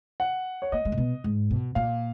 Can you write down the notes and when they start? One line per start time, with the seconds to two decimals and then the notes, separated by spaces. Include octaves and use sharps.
0.20 F#5
0.62 C#5
0.72 A#3 D#5
0.85 G#3
0.92 A#2
0.98 B2
1.24 G#2
1.51 B2
1.75 A#2 F5